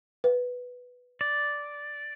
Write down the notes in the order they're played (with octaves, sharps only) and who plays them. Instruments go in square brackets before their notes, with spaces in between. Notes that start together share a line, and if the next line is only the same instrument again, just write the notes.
[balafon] B4
[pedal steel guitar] D5